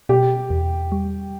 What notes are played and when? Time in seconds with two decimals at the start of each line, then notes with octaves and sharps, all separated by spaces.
0.09 B2 G4
0.50 E2
0.92 G3